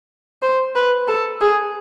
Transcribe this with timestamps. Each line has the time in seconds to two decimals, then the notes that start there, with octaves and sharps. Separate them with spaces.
0.42 C5
0.75 B4
1.08 A4
1.41 G#4